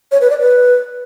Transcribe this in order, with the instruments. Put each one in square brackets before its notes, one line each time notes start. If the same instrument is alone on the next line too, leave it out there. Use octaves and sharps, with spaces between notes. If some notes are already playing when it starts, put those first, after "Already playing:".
[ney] C#5
B4
D5
B4